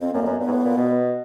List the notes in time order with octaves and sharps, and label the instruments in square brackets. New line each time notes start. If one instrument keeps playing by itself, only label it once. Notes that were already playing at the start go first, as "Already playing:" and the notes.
[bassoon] F2 [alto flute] C4
[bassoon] F#2 [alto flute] A#3
[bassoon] F2
[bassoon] F#2 [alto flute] B3
[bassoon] G2 [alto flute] B3
[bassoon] G#2
A2
A#2
B2